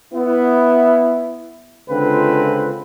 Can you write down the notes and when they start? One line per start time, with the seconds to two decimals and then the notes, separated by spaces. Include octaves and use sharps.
0.14 B3 E4
1.90 C#2 D3 C4 F4 B4